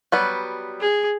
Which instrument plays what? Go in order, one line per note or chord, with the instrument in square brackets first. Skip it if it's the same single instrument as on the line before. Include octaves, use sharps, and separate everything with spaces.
[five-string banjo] F#3 G3 B3
[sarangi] G#4